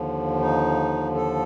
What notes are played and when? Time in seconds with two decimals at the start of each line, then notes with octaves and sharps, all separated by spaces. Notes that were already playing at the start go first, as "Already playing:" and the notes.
Already playing: D#2 D3 F3
0.40 D#4
1.15 A4